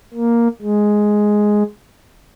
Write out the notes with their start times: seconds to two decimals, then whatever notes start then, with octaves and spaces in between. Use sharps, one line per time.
0.14 A#3
0.62 G#3